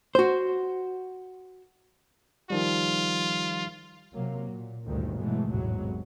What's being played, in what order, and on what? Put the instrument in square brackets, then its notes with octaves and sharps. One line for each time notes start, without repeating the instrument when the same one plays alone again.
[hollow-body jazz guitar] F#4 C5
[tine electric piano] D#3 F3 G3 [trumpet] F4
[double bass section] C3 F#3 A#3
A#2
G1 D2 G2 A#2 D3 D#3
B2 E3 F#3 G#3 A3
G#1 E2 A2 C3 F#3 G#3